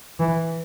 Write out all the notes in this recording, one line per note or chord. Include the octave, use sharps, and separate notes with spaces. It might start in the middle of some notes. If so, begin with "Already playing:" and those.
E3